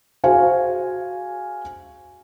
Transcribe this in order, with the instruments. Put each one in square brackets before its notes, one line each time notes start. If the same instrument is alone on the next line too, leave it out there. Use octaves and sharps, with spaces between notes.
[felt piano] F#4 G#4 C5 F5 G#5